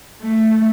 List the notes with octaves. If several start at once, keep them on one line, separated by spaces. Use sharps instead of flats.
A3